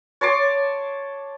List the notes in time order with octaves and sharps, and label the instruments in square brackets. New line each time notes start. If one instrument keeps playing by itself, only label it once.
[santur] C#5 A5 C6 D6